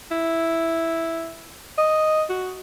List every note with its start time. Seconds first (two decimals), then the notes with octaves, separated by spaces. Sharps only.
0.11 E4
1.78 D#5
2.30 F#4